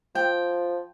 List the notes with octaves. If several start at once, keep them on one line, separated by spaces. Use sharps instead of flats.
F3 G5